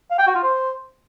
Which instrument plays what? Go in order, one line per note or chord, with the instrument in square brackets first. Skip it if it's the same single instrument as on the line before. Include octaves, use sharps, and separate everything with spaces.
[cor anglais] F5
G5
F#4
F4
C5